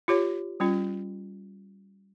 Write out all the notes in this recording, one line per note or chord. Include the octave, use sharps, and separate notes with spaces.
F4 G4 C#5
G3 C#4 F4